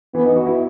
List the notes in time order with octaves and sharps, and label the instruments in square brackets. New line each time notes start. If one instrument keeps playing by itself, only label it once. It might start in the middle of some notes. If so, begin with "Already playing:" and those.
[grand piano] E3 [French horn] B3
[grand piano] D#4
F#4
E4